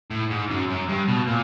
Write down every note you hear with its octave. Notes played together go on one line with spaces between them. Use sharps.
A2
G#2
F#2
F#2
G2
B2
A#2